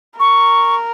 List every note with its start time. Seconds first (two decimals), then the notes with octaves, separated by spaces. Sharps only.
0.19 A#4 C#6